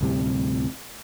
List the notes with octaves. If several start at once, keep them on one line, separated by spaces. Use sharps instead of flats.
D2 A2 C3 G3